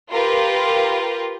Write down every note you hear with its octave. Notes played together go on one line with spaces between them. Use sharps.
F4 G4 A#4 B4